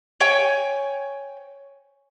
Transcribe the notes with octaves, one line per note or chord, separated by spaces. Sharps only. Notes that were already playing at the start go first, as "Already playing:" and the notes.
C#5 G5 G#5